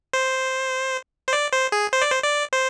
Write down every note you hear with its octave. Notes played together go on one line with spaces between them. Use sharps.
C5
C5
D5
C5
G#4
C5
D5
C5
D5
C5